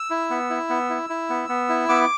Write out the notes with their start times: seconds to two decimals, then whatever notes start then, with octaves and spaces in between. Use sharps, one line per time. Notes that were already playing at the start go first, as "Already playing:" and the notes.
Already playing: E6
0.10 E4
0.30 B3
0.50 E4
0.70 B3
0.90 E4
1.10 E4
1.30 B3
1.49 B3
1.69 E4
1.89 B3 D6